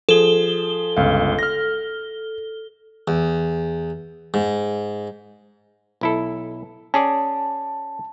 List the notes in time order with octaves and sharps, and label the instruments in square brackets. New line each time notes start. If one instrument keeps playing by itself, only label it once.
[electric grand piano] F3 G#4 [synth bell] A4 G7
[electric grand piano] G1 C#2 F5
F6 A#6
[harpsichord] E2
G#2
[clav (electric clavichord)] B1 E4 A4
[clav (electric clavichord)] C#4 G#4 D5 [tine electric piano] A5